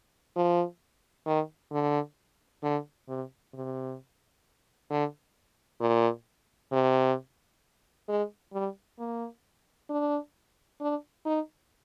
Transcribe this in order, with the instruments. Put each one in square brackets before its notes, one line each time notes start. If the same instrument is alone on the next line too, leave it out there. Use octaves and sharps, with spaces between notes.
[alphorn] F3
D#3
D3
D3
C3
C3
D3
A#2
C3
G#3
G3
A#3
D4
D4
D#4